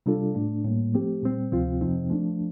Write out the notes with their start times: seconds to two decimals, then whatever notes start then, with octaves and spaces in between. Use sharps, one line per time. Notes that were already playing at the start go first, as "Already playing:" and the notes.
0.06 C3 G3 D4 F4 A4
0.35 A2 A3 D4
0.64 A2 G3 A#3
0.94 F3 A3 C4 G4
1.23 A#2 G3 C4
1.52 D2 C3 F3 C4 F4
1.81 F2 C3 F3 C4 D#4
2.10 F3 A3 D4